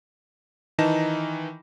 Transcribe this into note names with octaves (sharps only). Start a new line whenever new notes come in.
D#3 E3 D#4 A5 A#6 E7